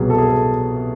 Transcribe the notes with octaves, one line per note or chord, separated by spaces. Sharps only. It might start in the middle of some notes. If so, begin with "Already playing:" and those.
Already playing: C2 B2 F#3 G#4
A4
G#4
A4